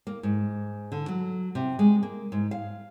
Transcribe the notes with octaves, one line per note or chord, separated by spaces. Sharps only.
A#3
G#2
D3
F#3
C3
G#3
A#3
G#2
F5